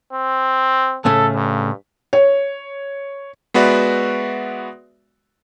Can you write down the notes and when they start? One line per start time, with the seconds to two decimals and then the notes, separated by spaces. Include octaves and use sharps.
0.13 C4
1.05 A2 C#3 A3 A4
1.35 G2
2.13 C#5
3.54 G#3 B3 F#4 B4 D5 E5